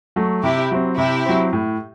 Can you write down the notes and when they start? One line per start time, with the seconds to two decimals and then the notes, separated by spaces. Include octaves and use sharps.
0.16 F#3 A3
0.43 C3 E4 G4
0.71 F#3 C4
0.98 C3 E4 G4
1.26 F#3 C4
1.53 A2